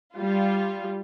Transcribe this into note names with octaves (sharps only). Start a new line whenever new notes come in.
G3 F4